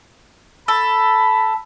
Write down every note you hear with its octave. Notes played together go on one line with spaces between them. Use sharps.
A4 B5